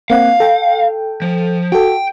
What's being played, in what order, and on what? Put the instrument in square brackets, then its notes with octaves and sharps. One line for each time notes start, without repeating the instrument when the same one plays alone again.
[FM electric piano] A#3 C4 F#5 [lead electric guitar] F5
[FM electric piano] A4 G5
[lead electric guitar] F3
[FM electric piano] F#4 A4 [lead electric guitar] G5